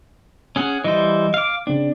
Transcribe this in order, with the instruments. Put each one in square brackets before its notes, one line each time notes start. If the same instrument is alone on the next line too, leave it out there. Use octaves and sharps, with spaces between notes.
[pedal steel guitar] C#4 G#4 F#5
[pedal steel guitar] E3 G3 C5 [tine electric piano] D#5
[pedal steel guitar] F5 D6
[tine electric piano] C#3 C4 [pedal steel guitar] D4